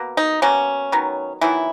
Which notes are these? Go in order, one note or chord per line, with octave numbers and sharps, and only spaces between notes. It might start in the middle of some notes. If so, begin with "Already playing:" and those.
Already playing: B2 A#3
D#4
B2 A#3 C#4
D#3 F#3 B3
D#3 E3 F#3 B3 E4